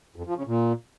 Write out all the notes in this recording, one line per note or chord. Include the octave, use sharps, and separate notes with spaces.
F2
F3
C#3
A#2